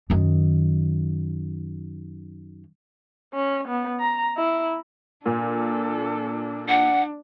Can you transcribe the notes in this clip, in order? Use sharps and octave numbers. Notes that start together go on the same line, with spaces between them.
F#2 D#3
C#4
B3
A#5
E4
A#2 D4 A4
D4 F#5